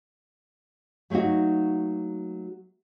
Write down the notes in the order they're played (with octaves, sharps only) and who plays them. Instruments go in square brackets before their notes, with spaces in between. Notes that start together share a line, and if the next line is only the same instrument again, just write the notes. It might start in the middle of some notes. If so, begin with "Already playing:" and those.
[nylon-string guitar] F#3 A3 A#3 D#4 F#4